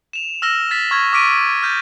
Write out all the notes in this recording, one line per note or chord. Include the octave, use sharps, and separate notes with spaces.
E7 F7
E6 F6 A#6 E7 G7
A6 B6
C#6 F6 G#6
C#6 D6 F6 B6 D7 D#7
F6 G6 A6